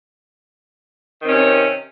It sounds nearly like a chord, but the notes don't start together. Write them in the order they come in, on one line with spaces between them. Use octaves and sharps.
D#3 C4 C#4 C3